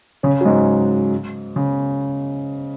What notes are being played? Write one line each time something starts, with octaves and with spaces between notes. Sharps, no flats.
C#3 C#4
F#3
G#2 G#3
C#3